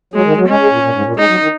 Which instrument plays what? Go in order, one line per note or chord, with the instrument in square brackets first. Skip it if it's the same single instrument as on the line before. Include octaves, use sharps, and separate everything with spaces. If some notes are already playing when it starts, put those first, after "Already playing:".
[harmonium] F#3 [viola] G#3
[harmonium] D#3
F#3
[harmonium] G#3 [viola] C#4
[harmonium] G#3
A#2
A#2
G#2
A#2
[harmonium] G#3 [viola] D#4
[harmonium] F#3
D#3